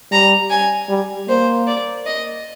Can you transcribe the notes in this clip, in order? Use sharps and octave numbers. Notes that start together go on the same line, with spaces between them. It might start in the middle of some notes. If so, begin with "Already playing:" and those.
G3 A#5
G#5
G3
A#3 C5
D5
D#5